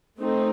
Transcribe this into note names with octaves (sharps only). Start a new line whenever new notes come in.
A3 C4 D#4